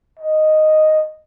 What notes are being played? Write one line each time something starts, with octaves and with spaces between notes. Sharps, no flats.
D#5